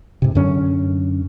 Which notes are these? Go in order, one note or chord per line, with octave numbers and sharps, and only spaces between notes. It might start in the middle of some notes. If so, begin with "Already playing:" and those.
G#2 C3
F#2 D3 C#4